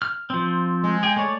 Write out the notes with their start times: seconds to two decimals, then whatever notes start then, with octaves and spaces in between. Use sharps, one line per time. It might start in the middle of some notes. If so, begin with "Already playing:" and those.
0.02 F6
0.30 F3 C4
0.84 G#3
1.03 G#4 G5
1.16 A3 C#5 D5